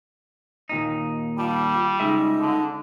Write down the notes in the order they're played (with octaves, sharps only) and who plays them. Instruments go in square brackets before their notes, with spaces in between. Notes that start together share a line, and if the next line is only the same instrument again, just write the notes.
[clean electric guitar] D#2 A#2 D#4
[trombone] G3 [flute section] F4 A5
[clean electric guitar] C#2 G#3 E5 [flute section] D#4
[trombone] D3